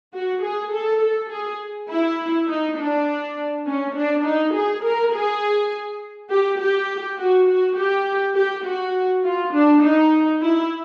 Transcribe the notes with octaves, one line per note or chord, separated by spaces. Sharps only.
F#4
G#4
A4
A4
G#4
E4
D#4
D4
C#4
D4
D#4
G#4
A#4
G#4
G4
G4
F#4
F#4
G4
G4
F#4
F4
D4
D#4
E4